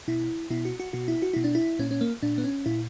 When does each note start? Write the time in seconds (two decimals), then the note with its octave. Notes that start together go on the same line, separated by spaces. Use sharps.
0.08 B2 E4
0.50 B2 E4
0.65 F#4
0.80 F#4
0.93 B2 F#4
1.08 E4
1.22 F#4
1.33 B2 E4
1.44 D4
1.55 E4
1.79 A#2 C#4
1.91 C#4
2.01 A#3
2.23 A#2 D4
2.38 B3
2.44 C#4
2.66 A#2 E4